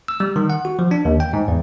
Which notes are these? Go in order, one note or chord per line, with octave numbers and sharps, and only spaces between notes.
E6
G3
D#3
F#5
F#4
F3
D4
D#2
G5
G#2
E2